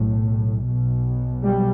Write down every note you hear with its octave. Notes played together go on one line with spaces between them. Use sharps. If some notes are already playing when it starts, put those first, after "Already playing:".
Already playing: B1 A2
B1 B2
G3